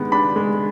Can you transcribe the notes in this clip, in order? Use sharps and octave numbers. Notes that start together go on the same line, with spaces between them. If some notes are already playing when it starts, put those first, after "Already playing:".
Already playing: D#3 G#3 B3 D4
D4 B5
G#3